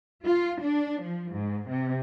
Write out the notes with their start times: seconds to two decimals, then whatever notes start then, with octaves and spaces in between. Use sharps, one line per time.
0.24 F4
0.61 D4
1.00 F3
1.31 G#2
1.69 C3